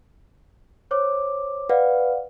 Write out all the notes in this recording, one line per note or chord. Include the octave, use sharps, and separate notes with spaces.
C5 C#5 D6
B4 D5 F5 F#5